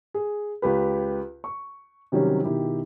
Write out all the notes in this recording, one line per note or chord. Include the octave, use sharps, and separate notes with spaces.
G#4
C#2 G4 B4
C#6
C3 D#3 F#3 G3 C#4
B2 D#3 E4 G4